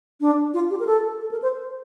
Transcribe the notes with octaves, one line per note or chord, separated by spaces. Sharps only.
D4
F4
G4
A#4
A4
A4
A#4
C5